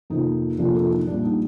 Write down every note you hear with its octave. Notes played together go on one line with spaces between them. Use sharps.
F2 C3 F3 A#3 D#4
F2 C3 F3 A#3 D4 F4
F4 A4
D#4
A#1 A#2 G3 D4
D#4